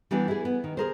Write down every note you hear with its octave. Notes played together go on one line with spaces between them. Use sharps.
E3 G3 B3 D4
E4 G#4
B3
D#3
G#4 A#4 C5